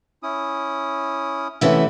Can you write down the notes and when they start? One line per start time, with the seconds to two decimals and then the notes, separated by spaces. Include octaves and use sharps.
0.23 C#4 E4 D#6
1.61 C3 E3 A3 B3 C#4 E5